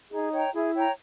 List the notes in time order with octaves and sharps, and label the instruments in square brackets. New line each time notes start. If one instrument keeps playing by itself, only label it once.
[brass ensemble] D#4 [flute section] G#4
[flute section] C#5 G5 A#5
[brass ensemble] E4 [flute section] G#4
[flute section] C#5 G5 A#5